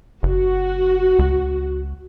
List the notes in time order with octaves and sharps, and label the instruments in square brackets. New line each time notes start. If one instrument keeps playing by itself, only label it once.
[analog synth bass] F#1 [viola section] F#4
[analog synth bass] C#2